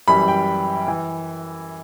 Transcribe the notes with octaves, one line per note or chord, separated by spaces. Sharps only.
F#2 E3 G3 B5
G5
E3